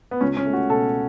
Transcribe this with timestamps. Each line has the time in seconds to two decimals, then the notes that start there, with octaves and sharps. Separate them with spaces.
0.11 B3
0.21 C#2 C#4
0.37 C#4
0.45 A3
0.53 F#4
0.70 B2 A4